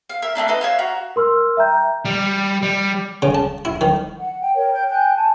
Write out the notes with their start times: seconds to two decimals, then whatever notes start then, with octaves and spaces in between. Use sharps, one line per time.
0.09 F5
0.22 A#4 E5
0.35 A3 C4 D4 D#4
0.48 A4 B4 D#5
0.61 C#5 E5 F5
0.79 F#4 A#5
1.16 A#4 C6 E6 F6
1.57 E5 G5 A#5 G6
2.05 G3
2.62 G3
3.22 C#3
3.35 A5
3.65 E4
3.81 D#3
4.19 F#5
4.41 G5
4.54 A#4 C#5 G5
4.73 G5 G6
4.89 G5 G#5 F#6 G6
5.14 G#5 A5